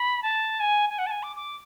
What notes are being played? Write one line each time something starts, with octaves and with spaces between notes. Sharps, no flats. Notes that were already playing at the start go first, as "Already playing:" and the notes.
Already playing: B5
A5
G#5
G#5
F#5
A5
G#5
D6
D6